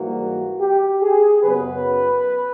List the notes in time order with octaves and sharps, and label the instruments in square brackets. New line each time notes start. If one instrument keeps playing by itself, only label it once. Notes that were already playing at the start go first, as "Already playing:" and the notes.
Already playing: [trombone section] G#2 E3 G3 A#3 F#4
G4
G#4
F#2 C#3 F#3 B3 B4